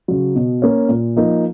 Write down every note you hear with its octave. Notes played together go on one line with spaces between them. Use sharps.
C#3 F#3
B2
A#3 C#4
A#2
F3 A#3 D#4